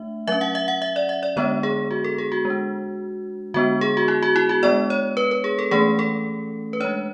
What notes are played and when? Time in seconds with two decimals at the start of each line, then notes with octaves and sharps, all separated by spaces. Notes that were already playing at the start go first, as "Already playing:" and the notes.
Already playing: A3 D4 E5
0.27 F#3 C#4 E5
0.41 F#5
0.55 E5
0.68 F#5
0.82 E5
0.96 D5
1.09 E5
1.23 D5
1.36 D3 G#3 B3 D4 C#5
1.63 G#4
1.91 F#4
2.04 A4
2.18 G#4
2.32 F#4
2.45 G#3
2.50 D4
3.54 D3 G#3 B3 D4 F#4
3.81 G#4
3.97 F#4
4.08 E4
4.23 F#4
4.36 E4
4.49 F#4
4.63 G#3 B3 D4 D5
4.90 C#5
5.17 B4
5.31 B4
5.44 G#4
5.59 A4
5.71 E3 A3 C#4 G#4
5.99 A4
6.73 B4
6.80 G#3 D4 C#5